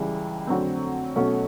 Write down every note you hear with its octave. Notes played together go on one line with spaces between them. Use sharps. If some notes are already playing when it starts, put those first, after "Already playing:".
Already playing: C#2 C#3 E3 G3
F2 D3 F#3 A3 C4
B2 F#3 A3 C#4